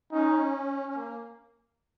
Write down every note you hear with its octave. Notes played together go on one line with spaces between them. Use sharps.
C#4 D#4
C#4
A#3